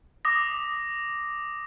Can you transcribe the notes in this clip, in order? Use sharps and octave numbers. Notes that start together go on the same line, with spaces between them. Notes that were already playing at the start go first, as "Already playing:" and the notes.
D6 D#6 A#6